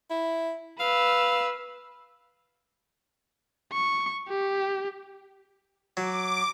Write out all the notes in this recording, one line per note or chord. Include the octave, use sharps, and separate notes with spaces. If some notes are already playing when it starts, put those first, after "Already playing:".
E4
B4 F5 E6
C#6
G4
F#3 D6